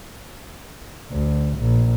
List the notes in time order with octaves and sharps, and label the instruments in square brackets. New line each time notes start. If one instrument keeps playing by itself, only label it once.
[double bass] D2
A#1